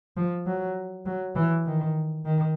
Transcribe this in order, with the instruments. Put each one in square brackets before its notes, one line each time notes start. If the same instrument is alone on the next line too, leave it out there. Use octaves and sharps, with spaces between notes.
[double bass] F3
F#3
F#3
E3
D#3
D#3